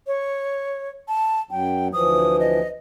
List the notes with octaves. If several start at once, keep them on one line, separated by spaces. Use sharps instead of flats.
C#5
A5
F#2 F#3 G5
D2 E3 F3 D#6
D#5